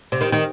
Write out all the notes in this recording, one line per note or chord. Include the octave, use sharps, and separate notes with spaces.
C3
D#3
D#3